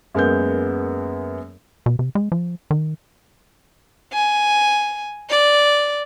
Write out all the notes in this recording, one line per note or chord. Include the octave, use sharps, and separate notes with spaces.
F#2 G#3 A#3 B3 F#5 G6
B2
C3
G#3
F3
D#3
G#5
D5